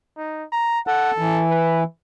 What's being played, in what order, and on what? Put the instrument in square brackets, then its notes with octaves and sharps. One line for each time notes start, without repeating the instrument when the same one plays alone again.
[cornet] D#4
A#5
[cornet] A4 [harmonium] F#5
[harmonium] E3
[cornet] B4